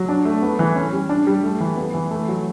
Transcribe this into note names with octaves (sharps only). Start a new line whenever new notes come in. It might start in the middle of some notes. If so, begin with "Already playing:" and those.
Already playing: F#3
D4
A3
B3
E3
C#4
G3
D4
G3
A3
E3
B3
E3
A3
F#3